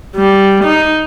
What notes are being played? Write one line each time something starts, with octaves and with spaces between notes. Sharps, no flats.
G3
D#4